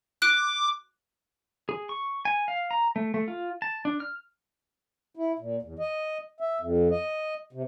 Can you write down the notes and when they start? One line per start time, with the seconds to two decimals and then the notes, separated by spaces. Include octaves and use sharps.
0.22 D6 F#6 D7
1.69 G#4
1.89 C#6
2.25 G#5
2.48 F5
2.71 A#5
2.96 A3
3.14 A3
3.28 F4
3.62 A5
3.85 D4
4.00 F6
5.16 E4
5.39 A#2
5.62 E2
5.79 D#5
6.40 E5
6.61 F2
6.91 D#5
7.53 C3